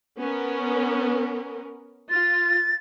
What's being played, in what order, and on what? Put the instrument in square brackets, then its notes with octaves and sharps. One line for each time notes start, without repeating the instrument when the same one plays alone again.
[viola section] B3 C#4 A#4
[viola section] F4 [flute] A6